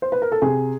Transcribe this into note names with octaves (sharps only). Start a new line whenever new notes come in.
C5
B4
A#4
A4
C3 G#4